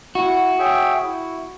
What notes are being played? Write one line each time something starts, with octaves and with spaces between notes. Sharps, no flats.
E4 F#4
G#4 C#5 E5 G5
E4